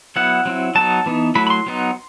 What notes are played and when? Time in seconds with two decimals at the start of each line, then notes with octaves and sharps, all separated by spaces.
0.16 F#3 B3 E4 F#5
0.45 F#3 C4 E4
0.75 F#3 B3 D#4 A5
1.06 E3 B3 D#4
1.35 F#3 A3 E4 B5
1.47 B5
1.50 C6
1.66 F#3 B3 D#4